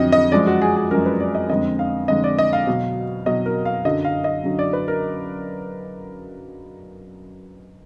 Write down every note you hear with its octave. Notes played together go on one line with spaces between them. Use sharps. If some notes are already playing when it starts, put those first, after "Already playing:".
Already playing: F2 D3 F#3 D#5
D#5
F#2 F3 G#3 D5
F#4
G#4
G#4
F#2 F3 G#3 A#4
B4
D5
D#5
F2 D3 G#3 D#5
F5
F2 D3 G#3 D#5
D5
D#5
F5
B2 F#3
B2 F#3 D#5
A#4
F5
F#2 D3 F#3 D#5
F5
D#5
F#2 D3 F#3
D5
B4
A#4